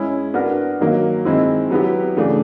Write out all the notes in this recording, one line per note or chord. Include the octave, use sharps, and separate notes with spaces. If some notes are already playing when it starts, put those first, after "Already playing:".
Already playing: G#3 C#4 E4 G#4
B3 D4 F#4 A#4
D#3 F#3 A#3
D#3 G#3 C4 E4
F#3 B3 E4 G4
C#3 E3 A3 D4